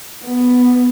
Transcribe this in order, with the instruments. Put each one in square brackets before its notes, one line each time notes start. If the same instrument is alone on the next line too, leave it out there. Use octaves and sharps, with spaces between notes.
[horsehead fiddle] B3